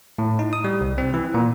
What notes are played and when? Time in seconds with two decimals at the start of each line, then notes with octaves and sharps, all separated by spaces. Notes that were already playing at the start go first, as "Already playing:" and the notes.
0.18 A2
0.39 D#4
0.53 D#6
0.64 G3
0.81 C2
0.98 C4
1.14 E3
1.34 A#2